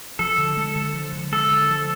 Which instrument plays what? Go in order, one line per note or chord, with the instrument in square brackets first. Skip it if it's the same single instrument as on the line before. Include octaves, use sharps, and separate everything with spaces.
[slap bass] F3 [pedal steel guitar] A4
[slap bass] D3
G#3
D3
F3
D3
[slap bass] G#3 [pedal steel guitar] A4
[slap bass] D3
F3